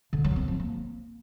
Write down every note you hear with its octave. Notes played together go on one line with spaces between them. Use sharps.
D3
F#3
C4
F3
A#3